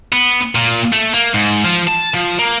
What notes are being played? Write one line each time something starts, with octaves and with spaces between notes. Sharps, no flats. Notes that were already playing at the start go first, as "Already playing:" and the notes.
B3
A#2
A3
A#3
G#2
F3
A5
F3
A#3